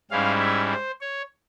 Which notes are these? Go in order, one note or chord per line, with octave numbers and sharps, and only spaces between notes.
G#2 G3 C#4 E4 F5
E5
C5
C#5